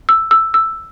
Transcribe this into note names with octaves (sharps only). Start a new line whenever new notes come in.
E6
E6
E6